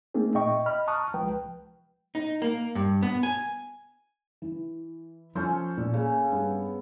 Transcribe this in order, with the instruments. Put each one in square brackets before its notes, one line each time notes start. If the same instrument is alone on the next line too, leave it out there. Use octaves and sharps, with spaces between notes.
[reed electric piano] A3 A#3 C4 D#4 G#4
A#2 D#5 E5 G5 C#6
D#5 B5 F6
A5 A#5 C#6 D#6 F6 F#6
C2 F3 G#3 B4 G5
[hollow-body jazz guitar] D#4
A#3
G2
B3
G#5
[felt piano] E3
[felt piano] F3 C6 G6 [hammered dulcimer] C#4 A4
[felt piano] A#2
[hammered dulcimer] C#3 [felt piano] A#3
[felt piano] G2 [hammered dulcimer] B3